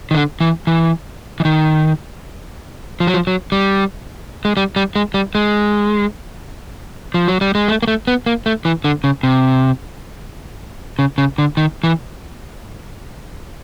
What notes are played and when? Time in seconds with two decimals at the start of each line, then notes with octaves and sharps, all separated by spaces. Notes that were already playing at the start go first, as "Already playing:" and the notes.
0.11 D#3
0.15 D3
0.41 E3
0.67 E3
1.40 E3
1.45 D#3
3.00 F3
3.07 F#3
3.14 F3
3.27 F#3
3.52 G3
4.45 G#3
4.57 G3
4.76 G3
4.96 G#3
5.14 G3
5.35 G#3
7.14 F3
7.28 F#3
7.41 G3
7.55 G#3
7.68 A3
7.83 A#3
7.88 A3
8.07 B3
8.26 A#3
8.46 A3
8.65 E3
8.84 D3
9.04 C#3
9.23 C3
10.99 C#3
11.18 C#3
11.38 D3
11.57 D#3
11.84 E3